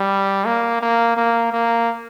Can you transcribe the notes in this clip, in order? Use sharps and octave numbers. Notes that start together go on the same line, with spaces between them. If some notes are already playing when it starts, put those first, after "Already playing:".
Already playing: G3
A#3
A#3
A#3
A#3